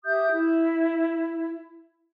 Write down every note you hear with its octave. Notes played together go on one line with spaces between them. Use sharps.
G4 E5 D#6 G6
E4